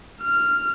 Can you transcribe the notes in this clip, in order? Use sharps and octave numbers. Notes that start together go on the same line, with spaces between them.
F6